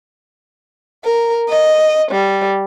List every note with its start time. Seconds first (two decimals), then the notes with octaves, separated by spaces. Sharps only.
1.04 A#4
1.49 D#5
2.11 G3